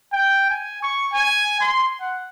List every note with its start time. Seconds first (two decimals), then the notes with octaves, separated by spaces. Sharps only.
0.12 G5
0.50 G#5
0.82 C#6
1.13 G#5
1.60 C6
2.01 F#5